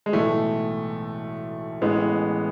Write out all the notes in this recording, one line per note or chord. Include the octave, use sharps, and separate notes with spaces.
G#3
B1 A2 E3 A3
A1 A2 E3 G#3 B3